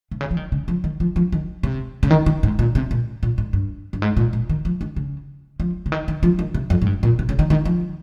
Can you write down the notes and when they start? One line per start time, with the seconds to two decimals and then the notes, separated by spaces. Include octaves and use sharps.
0.11 C3
0.21 C#3
0.31 F3
0.37 D#3
0.52 C#3
0.68 F3
0.84 D#3
1.00 F3
1.16 F3
1.32 D#3
1.63 C3
2.03 C#3
2.10 D#3
2.26 D#3
2.43 G#2
2.59 A#2
2.75 C3
2.91 A#2
3.23 A#2
3.38 G#2
3.53 G2
3.93 G2
4.02 G#2
4.17 A#2
4.33 A#2
4.49 D#3
4.65 F3
4.81 D#3
4.96 C#3
5.60 F3
5.86 C#3
5.92 D#3
6.08 D#3
6.23 F3
6.39 D#3
6.54 C3
6.70 F2
6.82 G#2
6.86 G2
7.03 A#2
7.19 C3
7.29 C#3
7.39 D#3
7.50 D#3
7.65 F3